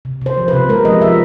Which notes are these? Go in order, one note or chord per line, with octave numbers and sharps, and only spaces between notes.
C3
C3 C5
F3
B4
C3
G#3 A#4
F3 D#5
F3 E5